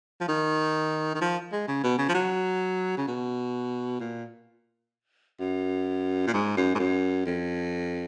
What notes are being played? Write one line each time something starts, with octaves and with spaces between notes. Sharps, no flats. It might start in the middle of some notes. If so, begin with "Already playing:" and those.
F3
D#3
D#3
F3
G#3
C#3
B2
C#3
F3
F#3
C#3
B2
A#2
F#2
A#2
G#2
F#2
G#2
F#2
F2